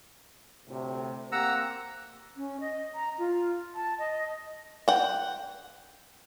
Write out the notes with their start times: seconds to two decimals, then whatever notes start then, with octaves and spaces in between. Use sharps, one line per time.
0.68 D2 A2 C3
1.32 A#3 C4 G4 F#5 A#5 E6
2.36 C#4
2.60 D#5
2.95 A#5
3.19 F4
3.75 A5
3.99 D#5
4.88 F#5 G5